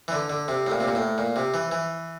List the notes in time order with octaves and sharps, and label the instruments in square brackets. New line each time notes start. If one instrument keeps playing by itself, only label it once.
[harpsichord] E3
D3
D3
C3
A2
A#2
C3
A#2
A2
A#2
C3
E3
E3